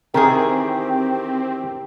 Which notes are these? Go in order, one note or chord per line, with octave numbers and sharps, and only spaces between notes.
D#3 E3 C4 G4 G#4 A#4